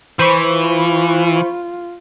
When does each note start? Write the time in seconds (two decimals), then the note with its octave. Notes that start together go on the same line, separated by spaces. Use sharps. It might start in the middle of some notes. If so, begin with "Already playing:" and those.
0.19 E3 C5 B5 C#6
0.53 F4